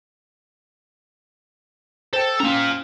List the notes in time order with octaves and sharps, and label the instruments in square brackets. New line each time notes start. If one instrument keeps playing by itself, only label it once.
[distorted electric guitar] A4 [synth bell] C5 G5
[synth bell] A#3 C#4 [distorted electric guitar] F4 A#5